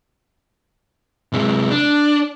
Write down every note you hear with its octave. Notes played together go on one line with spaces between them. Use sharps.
C3 G#3
D4